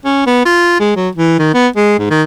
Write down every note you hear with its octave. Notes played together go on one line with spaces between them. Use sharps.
C#4
B3
F4
G#3
F#3
E3
D#3
B3
G#3
G#2
D#3